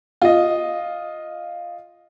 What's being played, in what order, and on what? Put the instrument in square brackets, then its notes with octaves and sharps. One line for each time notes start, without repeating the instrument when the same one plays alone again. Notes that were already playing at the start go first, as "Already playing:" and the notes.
[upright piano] F4 D#5